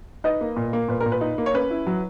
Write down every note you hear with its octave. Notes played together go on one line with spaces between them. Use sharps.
D#4 B4 D#5
A#3
A#2
A#3
A#2 B4
A#4
A#2
B4
D#4
A#3
C#5
C#4 B4
E4
F#3